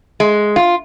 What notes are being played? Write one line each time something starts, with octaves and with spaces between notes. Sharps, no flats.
G#3
F4